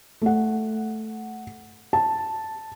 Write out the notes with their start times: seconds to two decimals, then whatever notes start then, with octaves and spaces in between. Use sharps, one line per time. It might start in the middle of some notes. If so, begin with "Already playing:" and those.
0.22 A3 F#5
1.93 A5